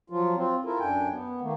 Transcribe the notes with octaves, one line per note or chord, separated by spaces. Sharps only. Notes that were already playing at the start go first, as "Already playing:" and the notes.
F3 F#3 F4
C4 F4
E4 F4 A4 A#4
F#2 D4 G5 G#5
B3
D#3 A3 A#3